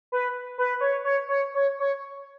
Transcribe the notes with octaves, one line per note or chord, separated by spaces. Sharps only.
B4
B4
C#5
C#5
C#5
C#5
C#5